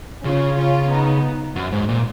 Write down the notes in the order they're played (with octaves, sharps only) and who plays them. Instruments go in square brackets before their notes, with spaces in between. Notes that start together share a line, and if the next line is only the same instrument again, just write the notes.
[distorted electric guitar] C#3 [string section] C#4 F4
[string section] C#4 F4
B3 D#4
[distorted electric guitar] F#2
G#2
A#2